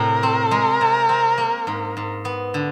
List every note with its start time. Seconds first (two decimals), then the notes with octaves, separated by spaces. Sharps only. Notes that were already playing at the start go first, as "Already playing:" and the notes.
Already playing: A2 C3 A3 A#4
0.23 C4
0.51 G#3
0.81 C3
1.09 C4
1.38 A#3
1.67 G#2
1.97 G#2
2.25 B3
2.54 D3